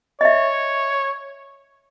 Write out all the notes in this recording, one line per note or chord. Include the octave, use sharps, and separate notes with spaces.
C#5 D#5 E5